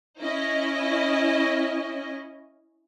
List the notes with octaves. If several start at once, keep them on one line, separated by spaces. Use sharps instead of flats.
C#4 E4 D#5